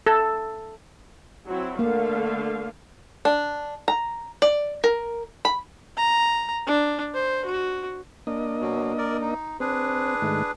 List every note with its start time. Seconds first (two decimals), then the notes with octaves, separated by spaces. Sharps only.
0.07 A4
1.46 F#3 C4 E4
1.79 D3 A3 A#3 F5
3.25 D4
3.88 A#5
4.42 D5
4.84 A#4
5.45 B5
5.97 A#5
6.67 D4
7.15 C5
7.45 F#4
8.27 A#3 D4 D#5
8.61 B2 F#3
8.98 A#4 D5
9.21 D#4
9.60 C4 D4 G#4 B4
10.22 G#2 D#3 A3